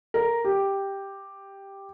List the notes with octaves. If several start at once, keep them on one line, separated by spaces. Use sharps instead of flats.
A#4
G4